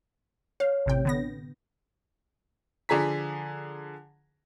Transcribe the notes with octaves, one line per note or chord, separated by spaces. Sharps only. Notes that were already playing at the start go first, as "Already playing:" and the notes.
C#5 F5
A1 C3 G5
D3 B3 A#6
D3 F3 G#4 G#5 A#5 B6